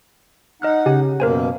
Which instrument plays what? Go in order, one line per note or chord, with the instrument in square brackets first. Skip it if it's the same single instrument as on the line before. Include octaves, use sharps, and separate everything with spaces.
[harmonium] D#4 F#5 [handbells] D#5 F6 F#6
[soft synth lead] C#3 [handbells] G4 G#5
[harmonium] F#2 B2 A#3 [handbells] A#4 C5 G#5